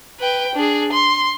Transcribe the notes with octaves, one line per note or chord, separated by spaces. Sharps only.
B4 G5
D4 G#4
C6